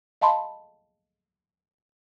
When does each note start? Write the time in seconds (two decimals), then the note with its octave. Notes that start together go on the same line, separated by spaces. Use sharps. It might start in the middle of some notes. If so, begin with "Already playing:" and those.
0.21 D#5 F5 A5 B5 C6